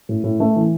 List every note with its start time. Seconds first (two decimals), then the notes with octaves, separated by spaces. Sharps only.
0.09 A2
0.24 A2
0.40 A3
0.56 E3